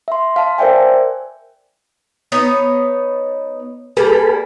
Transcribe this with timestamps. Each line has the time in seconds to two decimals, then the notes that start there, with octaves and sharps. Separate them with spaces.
0.08 E5 C6
0.36 F5 A5
0.58 A#4 C5 D5 E5 G5 G#5
2.32 B3 D#4 C#5
3.97 G3 A#3 G#4 A4 B4